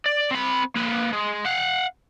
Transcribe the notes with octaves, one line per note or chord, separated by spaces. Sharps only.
D5
C4 B5
A#3 B4
G#3
F5 F#5